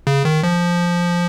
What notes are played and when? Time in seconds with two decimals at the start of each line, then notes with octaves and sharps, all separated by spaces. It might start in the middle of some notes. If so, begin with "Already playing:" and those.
0.07 C#3
0.25 D#3
0.43 F3